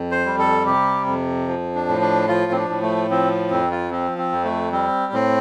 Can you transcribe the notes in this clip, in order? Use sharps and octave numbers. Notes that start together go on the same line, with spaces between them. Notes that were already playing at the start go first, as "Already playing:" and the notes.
Already playing: F2
C5
G3
A4
C3 G4
F2
F3
D4
A2
D4
F3 F4
C4
D4
A2
A3
F3 C4
F2 C4
F4
F3 C4
C4
F2
A3
G3 C4
A2 C4